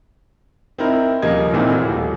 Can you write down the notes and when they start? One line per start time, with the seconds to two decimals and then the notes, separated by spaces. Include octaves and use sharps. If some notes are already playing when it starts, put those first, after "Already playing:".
0.78 C4 D#4 E4 A#4
1.22 D#1 C#3 F3 A#3 D#5 G#6
1.53 A#1 A#2 D#3 E3 A#3 C4
1.70 A2 E3 F#4
1.88 D#1